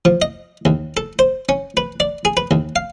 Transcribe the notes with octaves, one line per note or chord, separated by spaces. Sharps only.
F3
D#5
D#2
A4
C5
C#4
B4
D5
G#4
B4
D#2
F5